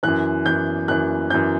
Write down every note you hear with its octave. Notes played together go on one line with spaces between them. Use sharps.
F#2 E3 F#6
F#2 E3 G6
F#2 E3 F#6
F#2 E3 G6